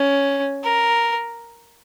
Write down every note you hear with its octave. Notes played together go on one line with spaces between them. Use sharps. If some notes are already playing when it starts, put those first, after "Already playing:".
Already playing: C#4
A#4